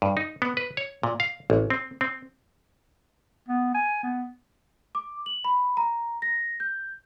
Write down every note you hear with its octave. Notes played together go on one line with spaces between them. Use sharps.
G2
D#4
B3
B4
C#5
A#2
F5
A1
C4
C4
B3
G#5
B3
D6
F#7
B5
A#5
A#6
G6